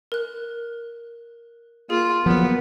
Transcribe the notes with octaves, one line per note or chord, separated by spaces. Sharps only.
A#4 F#6
A#3 F4 G#4
F3 F#3 A#3 B3